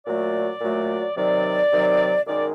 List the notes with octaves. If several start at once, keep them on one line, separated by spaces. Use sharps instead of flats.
A#2 F#3 A3 D5
A#2 F#3 A3
C3 D#3 F#3 D5
C3 D#3 F#3
F#2 D#3 G#3 D5